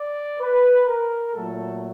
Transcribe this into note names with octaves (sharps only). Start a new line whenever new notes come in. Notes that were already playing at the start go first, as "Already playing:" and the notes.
Already playing: D5
B4
A#4
A#2 F#3 A3 A4